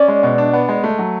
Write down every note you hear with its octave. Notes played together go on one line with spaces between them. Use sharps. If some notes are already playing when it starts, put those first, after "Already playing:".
Already playing: C#4 D5
G#3
B2
D4
B3
G#3
A3
F#3